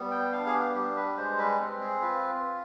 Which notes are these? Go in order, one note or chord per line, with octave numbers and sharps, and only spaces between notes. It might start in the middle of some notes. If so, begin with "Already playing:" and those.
Already playing: G3 B3
G5
D4 F5
G#4
G4
G3 G4
B4
G#3 C5
B4
C4
G#4
F4 B4